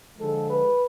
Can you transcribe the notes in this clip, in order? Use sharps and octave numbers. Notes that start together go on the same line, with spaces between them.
D3 F3 G#3 A4
B4